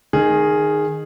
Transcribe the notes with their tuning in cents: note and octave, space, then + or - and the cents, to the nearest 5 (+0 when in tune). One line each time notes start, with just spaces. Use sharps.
D#3 -15 G#4 +0